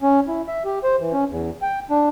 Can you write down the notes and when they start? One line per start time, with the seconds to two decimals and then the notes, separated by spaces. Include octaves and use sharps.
0.02 C#4
0.28 E4
0.48 E5
0.65 G4
0.84 C5
1.00 E3
1.13 C#4
1.30 E2
1.62 G5
1.90 D4